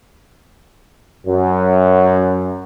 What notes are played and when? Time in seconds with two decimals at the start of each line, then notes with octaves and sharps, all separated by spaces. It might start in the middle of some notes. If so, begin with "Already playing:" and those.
1.26 F#2